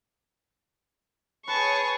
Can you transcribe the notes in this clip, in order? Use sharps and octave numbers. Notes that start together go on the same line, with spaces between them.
G#4 B4 C#5 A5 C#6